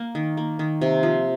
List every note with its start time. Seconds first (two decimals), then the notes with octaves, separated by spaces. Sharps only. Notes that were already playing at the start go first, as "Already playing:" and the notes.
Already playing: A#3
0.15 D#3
0.37 A#3
0.59 D#3
0.81 C3
1.03 F3